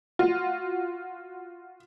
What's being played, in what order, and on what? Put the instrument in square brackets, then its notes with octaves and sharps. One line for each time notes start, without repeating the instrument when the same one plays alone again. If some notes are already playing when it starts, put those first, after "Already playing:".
[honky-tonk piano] F4 F#4